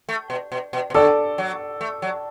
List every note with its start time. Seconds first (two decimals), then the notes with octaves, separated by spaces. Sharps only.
0.09 A3
0.30 B2
0.52 B2
0.73 B2
0.90 B2
0.94 D3 A4 D5
1.38 F#3
1.81 A3
2.02 F#3